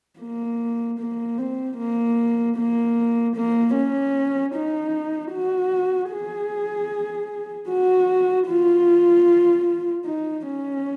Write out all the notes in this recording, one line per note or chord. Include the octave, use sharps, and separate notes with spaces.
A#3
A#3
C4
A#3
A#3
A#3
C#4
D#4
F#4
G#4
F#4
F4
D#4
C#4